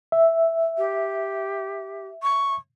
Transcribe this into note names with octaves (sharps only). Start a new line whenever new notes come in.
E5
G4
C#6